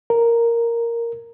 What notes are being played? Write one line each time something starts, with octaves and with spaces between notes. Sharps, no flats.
A#4